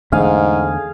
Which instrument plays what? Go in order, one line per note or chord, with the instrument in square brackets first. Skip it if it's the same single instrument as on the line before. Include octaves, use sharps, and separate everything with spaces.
[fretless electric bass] E2 D3 A3 [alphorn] G#2 [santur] G#4 F5